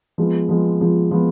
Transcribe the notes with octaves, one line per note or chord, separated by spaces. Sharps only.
F3 G#3 B3
F3 G#3 B3
F3 G#3 B3
F3 G#3 B3